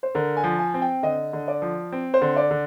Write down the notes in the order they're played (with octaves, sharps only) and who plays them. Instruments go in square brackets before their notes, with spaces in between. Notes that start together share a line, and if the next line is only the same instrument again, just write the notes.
[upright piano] C5
[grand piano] D3 [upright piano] A#4
[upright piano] G#5
[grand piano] F3
[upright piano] G#5
[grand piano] C4
[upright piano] G5
[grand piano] D3 [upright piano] D#5
[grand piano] D3
[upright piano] D5
[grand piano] F3
C4
[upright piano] C5
[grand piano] D3
[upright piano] D5
[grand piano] D3